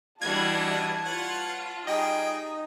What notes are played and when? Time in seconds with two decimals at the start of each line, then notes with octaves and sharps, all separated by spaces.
0.22 E3 G3 D4 F#4 D#5 A5 G#6
1.05 F4 B4 C#5 F#5
1.87 G3 D#4 G#4 D#5 G5